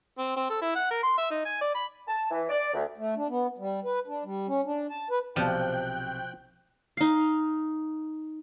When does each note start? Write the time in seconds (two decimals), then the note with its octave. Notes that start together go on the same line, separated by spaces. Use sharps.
0.18 C4
0.36 C4
0.50 A4
0.61 E4
0.75 F#5
0.91 A#4
1.03 C6
1.18 E5
1.31 D#4
1.45 G#5
1.61 D5
1.75 B5
2.08 A5
2.31 E3
2.49 D5
2.73 D2
2.98 A3
3.16 D4
3.29 B3
3.58 G3
3.84 B4
4.07 D4
4.24 G3
4.47 C#4
4.66 D4
4.90 A5
5.11 B4
5.36 B1 C3 F3 D5 G5 F#6 G6
6.97 D#4 F5